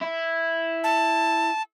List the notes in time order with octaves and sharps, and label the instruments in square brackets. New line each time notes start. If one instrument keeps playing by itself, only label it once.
[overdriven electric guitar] E4
[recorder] A5